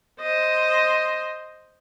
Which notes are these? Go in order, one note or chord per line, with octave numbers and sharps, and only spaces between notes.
C5 D#5